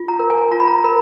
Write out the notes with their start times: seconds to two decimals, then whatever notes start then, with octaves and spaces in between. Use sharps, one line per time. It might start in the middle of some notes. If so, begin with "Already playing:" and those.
Already playing: F4
0.08 A#5
0.19 A#4
0.30 G#5
0.51 F4 A#5
0.60 B5
0.68 A#5
0.84 A#4 B5